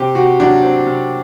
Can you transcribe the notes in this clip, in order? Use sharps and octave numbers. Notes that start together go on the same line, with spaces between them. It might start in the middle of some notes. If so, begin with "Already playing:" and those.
Already playing: C3 C4 G4
C3 F#4
F#3 D4
C4
C3